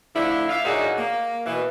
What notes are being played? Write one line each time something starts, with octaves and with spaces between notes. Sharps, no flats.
D3 F3 A3 D4 E4
E5 F5
A#2 F#3 D4 D#4 F#4 G#4
A#3
B2 E3